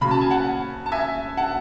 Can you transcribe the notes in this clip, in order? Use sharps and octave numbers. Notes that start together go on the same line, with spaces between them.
C#3 F#3 B5
A5
G#5
F#5 A5
A5
E5 G#5
F#5 A5